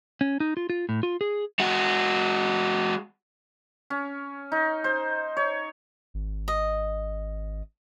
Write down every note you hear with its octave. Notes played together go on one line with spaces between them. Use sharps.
C#4
D#4
F4
F4
A2
F4
G#4
G#3 F#4
C#4
D#4
C5
C#5
G#1
D#5